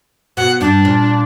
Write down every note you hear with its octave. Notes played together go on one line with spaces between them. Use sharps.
B2 F#5
G2 D4
A#2